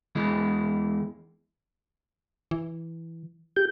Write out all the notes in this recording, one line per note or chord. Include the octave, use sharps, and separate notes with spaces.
E2 E3 G#3
E3
G4 G6